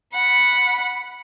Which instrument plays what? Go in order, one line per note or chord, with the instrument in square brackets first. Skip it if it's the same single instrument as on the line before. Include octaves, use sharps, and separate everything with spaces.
[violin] F#5 B5